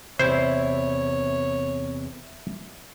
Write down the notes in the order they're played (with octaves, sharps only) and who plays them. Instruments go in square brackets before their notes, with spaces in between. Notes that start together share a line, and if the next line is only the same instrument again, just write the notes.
[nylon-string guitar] E2 C3 [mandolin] E4 [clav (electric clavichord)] C5 [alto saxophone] C#5